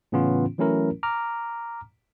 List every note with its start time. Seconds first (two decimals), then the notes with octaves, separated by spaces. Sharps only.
0.12 A2 C#3 E3 B3 C#4 F4
0.58 E3 F#3 A3 C#4 E4 A#4
1.03 A#5 D6 F6